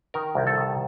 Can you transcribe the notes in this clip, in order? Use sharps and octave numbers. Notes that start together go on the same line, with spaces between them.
D#3 A#4
C2
A4
D#3